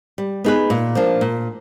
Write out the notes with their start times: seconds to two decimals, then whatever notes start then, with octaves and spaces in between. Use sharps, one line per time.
0.18 G3
0.44 B3 D#4 G#4 B4
0.70 A#2
0.95 F3 A#3 D4
1.21 A#2